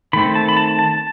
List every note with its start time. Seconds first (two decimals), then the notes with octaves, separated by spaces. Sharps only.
0.13 D#3 A3 C4 B5
0.35 A5
0.49 B5
0.57 A5
0.79 A5